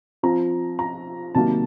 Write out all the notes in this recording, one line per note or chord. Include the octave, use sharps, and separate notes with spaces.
F3 C4 F4 A#5
A#5
C3 D#3 F#3 A#3 A5